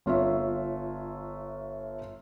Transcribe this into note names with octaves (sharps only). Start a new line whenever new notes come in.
G1 F4 C#5 E5